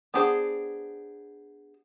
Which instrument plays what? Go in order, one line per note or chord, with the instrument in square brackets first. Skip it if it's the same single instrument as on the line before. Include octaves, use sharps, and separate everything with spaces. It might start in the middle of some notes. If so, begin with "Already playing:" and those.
[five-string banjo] B3 D4 G4 G#4 C5